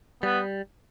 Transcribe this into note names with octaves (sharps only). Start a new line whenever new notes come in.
G3 B3